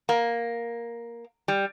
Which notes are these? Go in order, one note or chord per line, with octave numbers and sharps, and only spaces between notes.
A#3
G3